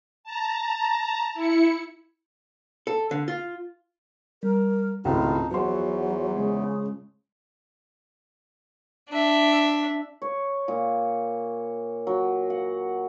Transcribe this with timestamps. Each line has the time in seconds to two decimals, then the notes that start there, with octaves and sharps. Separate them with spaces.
0.24 A5 A#5
1.34 E4 C#7
2.87 A4
3.11 D3
3.28 F4
4.43 G3 A#4
5.05 G#1 C#2 A2 D#4 F4 A5
5.51 E2 F3 F#3 C5 F#5 C6
6.37 C#3 G#3
9.10 D4 E5
10.22 C#5
10.68 A#2
12.07 F#3
12.50 F#5